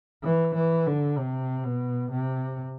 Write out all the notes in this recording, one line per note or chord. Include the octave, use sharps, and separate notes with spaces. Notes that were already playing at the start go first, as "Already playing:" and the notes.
E3
E3
D3
C3
B2
C3